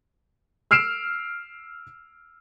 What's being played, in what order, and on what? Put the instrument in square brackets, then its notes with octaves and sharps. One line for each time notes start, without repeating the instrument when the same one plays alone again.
[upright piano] E6 F6 C7 D7 E7